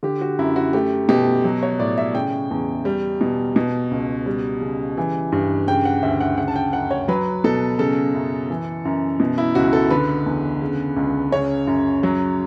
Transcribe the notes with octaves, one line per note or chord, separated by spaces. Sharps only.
D3 G4
F#4
F#2 E4
F#4
A3 G4
B2 G4
F#3
C#5
A2 D5
E5
C#3 G5
E2
G3
B2
B2
C#2
G3
C#3
E3
G2
C#3 G5
F#5
D2 E5
F#5
C#3 F#5
A5
G5
F#2 F#5
C#5
F#3 B4
B2 A4
C#3 A4
F#2
E3
F#2
B2
E4
C#2 F#4
A4
D3 B4
E2
C#3
C#2
C#3 C#5
F#2
F#3